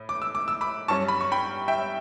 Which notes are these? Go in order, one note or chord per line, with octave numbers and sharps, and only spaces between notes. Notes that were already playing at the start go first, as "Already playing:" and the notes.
Already playing: A2
D6
E6
D6
E6
B5 D6
G2 F#3 C#4 A5 C#6
B5
C#6
G5 B5
E5 G5